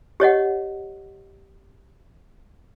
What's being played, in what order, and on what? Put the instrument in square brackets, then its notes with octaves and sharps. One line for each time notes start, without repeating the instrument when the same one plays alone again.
[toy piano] G4 C#5 D#5 F#5